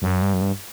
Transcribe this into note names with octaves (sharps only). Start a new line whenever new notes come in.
F#2
G2
F#2
G2